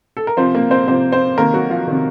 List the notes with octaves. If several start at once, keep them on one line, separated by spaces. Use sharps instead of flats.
A4
A#4
C3 F3 C4 C5
A#3 A#4
C4 C5
C3 F3 C5
C4 C5
C3 D#3 A#3 A#4
F#3 F#4
F3 F4
C3 D#3